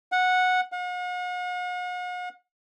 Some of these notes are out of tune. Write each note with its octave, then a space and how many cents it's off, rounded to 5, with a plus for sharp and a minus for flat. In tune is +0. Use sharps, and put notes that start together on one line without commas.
F#5 -10
F#5 -45